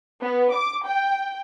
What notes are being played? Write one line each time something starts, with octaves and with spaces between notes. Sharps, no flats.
B3
D6
G5